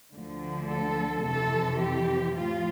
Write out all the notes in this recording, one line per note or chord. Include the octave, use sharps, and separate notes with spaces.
D2 D3 F3
A4
F2 C3 E3 A4
G4
A2 F3 F4